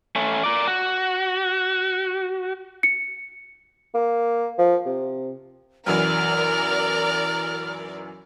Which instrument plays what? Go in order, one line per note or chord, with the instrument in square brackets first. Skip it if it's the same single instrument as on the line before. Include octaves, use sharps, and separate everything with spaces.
[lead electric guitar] A3 C#4
A#4 D5
F#4
[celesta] C#7
[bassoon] A#3
F3
C3
[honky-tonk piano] B1 F#2 E3 [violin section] A#4 D5 [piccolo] F6